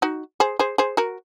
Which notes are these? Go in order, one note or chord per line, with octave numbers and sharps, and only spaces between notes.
D#4 F#4
G#4 C5
G#4 C5
G#4 C5
F#4 A#4